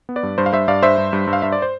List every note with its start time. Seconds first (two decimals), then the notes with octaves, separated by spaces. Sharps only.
0.09 B3
0.16 B4 D5
0.23 G2
0.38 G2 C5
0.46 F5
0.53 G2 C5 E5
0.68 G2 D5 F5
0.82 G2 C5 E5
0.98 G2
1.13 G2
1.27 G2
1.33 F5
1.42 G2 E5
1.52 D5
1.62 C5